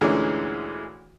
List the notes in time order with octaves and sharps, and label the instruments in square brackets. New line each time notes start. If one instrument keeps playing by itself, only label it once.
[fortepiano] D2 A#2 D3 E3 G#3 C#4